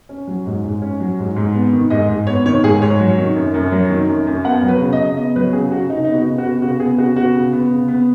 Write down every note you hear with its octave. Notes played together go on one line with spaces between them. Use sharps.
C#4
F#3
G#2
G#2
C#4
F#3
G#2
G#2
B3
D#3
G#2 D#5
G#2
B3 C#5
D#3 C#5
G#2 G#4
G#2 C#5
F#3
D#3
F#2
F#2
F#3
D#3
F#2
F#2
B3 F#5
F#3
B4
C#3
D#5
C#3
B3 D#5
F#3 B4
C#3 G#4
C#3 F#4
C#3 D#4
B3 D#4
F#4
C#3
F#4
B3
C#3 F#4
B3 G#4
C#3 F#4
B3 F#4
C#3
B3
C#3
B3